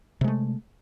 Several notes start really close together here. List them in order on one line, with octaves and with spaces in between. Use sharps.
C3 G#3 A3